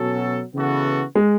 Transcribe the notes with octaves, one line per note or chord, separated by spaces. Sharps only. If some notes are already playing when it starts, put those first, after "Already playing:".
Already playing: B2 F#3 C#4 F#4 A4
C#3 E3 B3 F#4 A4
G#3